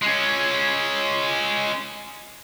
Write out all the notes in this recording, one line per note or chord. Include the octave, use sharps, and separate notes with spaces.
G#3 C#4